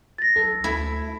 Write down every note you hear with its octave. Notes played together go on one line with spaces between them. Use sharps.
A6 A#6
B1 A4
D2 A3 E4